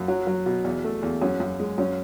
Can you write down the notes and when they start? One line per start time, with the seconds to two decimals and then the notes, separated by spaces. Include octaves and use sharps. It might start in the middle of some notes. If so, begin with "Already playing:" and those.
Already playing: F#2
0.08 F#3
0.27 F#3
0.46 B2
0.64 E2
0.84 A3
1.03 E2
1.21 F#2 C#4
1.40 F#2
1.60 G#3
1.78 F#2 C#4